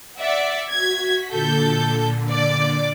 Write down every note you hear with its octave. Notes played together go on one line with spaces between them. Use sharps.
D5 E5 F#5
F#4 G#6 B6
A#2 D3 A4 G6
D5 D6